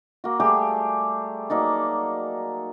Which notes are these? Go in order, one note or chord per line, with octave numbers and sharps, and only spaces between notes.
A#3 F#4
G3 A3 G4 G#4
F#3 A#3 D#4 D5